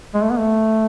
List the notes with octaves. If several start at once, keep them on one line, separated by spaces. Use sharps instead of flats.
G#3
A3
B3
A3